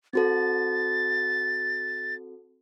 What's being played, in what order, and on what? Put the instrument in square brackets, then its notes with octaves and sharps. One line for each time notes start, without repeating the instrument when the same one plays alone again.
[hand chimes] C4 F#4 A4 [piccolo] A6